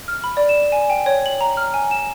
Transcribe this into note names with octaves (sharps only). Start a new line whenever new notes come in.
F6
B5
D5
E7
G#5
G5
C#5
F#7
A#5
F6
G#5
E7